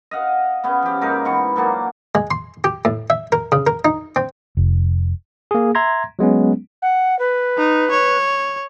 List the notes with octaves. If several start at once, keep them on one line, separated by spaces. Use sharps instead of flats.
D#5 F5 F#5
C#3 B3 C#4
F3 G4
G#2 A#3 D#4 A#4
E3 B3 C#6
A#2 F#3 A#3 D4
G#3
C6
G4
A2
E5
A#4
C#3
A#4
D#4
C4
F1
A#3 G#4
E5 A#5 C6 G#6 A#6
F#3 G#3 B3 C#4
F#5
B4
D#4
C#5